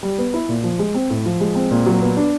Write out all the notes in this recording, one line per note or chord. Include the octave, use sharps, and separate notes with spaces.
G3
B3
E4
A#2
F3
G#3
C4
A2
F3
G#3
C4
A#2
F#3
B3
D4